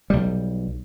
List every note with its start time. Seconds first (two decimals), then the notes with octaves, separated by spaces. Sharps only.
0.10 B1 G3